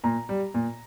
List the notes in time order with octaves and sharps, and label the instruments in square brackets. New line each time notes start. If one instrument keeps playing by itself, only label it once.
[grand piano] A#2 A#5
G3
A#2